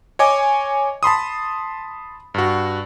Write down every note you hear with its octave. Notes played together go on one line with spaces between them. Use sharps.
C#5 D#5 G#5 D6
A5 B5 C6 D#6
G2 F#4